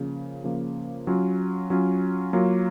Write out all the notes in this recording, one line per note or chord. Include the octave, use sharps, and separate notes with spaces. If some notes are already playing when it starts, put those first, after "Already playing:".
Already playing: C#3 F3 A#3
C#3 F3 A#3
F#3 C#4 F4
F#3 C#4 F4
F#3 A#3 F4